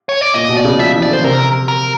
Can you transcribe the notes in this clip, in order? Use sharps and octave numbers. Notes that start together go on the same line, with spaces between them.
C#5
D5
A#2 D#5
B2
D5
C#3
F3 E5
E3
D5
D3 C5
C3 A#4
A#4